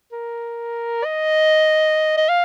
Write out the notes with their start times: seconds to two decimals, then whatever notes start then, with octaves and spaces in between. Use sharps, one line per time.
0.12 A#4
1.04 D#5
2.17 D#5
2.29 F5